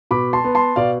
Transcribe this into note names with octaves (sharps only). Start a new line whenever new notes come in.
B2 B5 D6
A5 C6
B3
A5 C6
B2 D5 F5